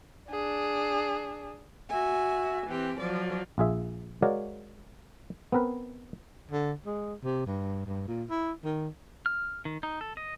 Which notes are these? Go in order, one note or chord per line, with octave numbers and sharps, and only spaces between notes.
D4 G#4
F#4 E5 G#5
E3 C4 G4
F3 F#3 D5
A#1 F4 G#4 E5
G#3 F#4 A#4 C#5 D5 F5
B3 C4 A#4 B4
D3
G#3
C3
G2
G2
A#2
E4
D#3
F6
D#3
D#4
A4
D#5